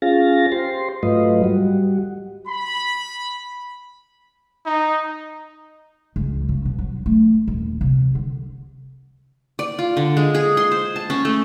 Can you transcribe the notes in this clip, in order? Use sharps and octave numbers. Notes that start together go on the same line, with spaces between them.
C#4 F4 G#4 F5 A6 A#6
G4 C5 C6
G#2 F#3 A3 F4 B4 D#5
G3 F#4
B5
D#4
C#2
C#3
B2
F#3
A3
D#1
C3
D3
D5
F4
D3
G#3
G#4
C6
C5
A5
C#4
A3